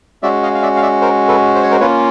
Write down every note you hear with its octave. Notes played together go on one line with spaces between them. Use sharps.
G#3 C#4 F#4 D5 E5
D#5 F5
F5
D5 E5
F5
D5 E5
A#4 C5
A4 B4
C5
C#5
A#4 C5
A#3 C#4 F4 B4 C#5